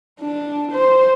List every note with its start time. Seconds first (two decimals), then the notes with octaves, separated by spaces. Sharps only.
0.20 D4
0.72 C5